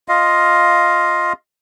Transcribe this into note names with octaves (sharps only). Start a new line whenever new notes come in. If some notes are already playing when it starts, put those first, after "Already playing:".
F4 D#5 F5